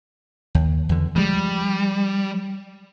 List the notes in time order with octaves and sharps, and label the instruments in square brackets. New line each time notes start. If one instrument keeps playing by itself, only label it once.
[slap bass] D#2
E2 D3
[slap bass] F3 G#3 [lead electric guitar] G3